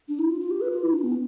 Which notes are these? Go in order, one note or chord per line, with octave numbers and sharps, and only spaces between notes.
D4
E4
F4
F4
G4
B4
F4
E4
D4
B3